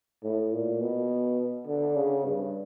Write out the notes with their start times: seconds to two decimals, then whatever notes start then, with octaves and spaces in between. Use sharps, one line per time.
0.24 A2
0.53 A#2
0.81 B2
1.67 D3
1.96 C#3
2.26 G2